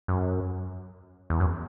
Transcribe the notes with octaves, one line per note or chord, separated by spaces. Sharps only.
F#2
E2
F#2